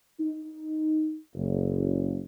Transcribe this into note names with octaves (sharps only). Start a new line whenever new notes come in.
D#4
F#1